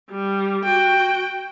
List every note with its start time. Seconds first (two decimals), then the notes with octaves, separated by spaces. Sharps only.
0.10 G3
0.64 F#4 G5